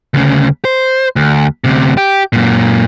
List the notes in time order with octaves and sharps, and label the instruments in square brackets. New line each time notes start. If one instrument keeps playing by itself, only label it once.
[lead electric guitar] D2 C#3
C5
D2
D2 C3
G4
F#2 A#2